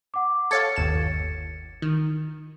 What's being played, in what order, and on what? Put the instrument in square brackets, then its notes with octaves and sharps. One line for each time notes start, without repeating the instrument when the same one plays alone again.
[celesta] F#5 D6
[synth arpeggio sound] A4 C#5 F5 [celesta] G#6 A6 C#7
[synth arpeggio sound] G1 D#2 E7
D#3